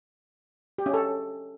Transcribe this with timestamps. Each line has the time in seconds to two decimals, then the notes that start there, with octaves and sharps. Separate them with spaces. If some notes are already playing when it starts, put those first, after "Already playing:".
0.78 G4
0.86 C#4
0.94 A4